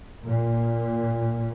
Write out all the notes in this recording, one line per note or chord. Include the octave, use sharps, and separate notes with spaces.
A#2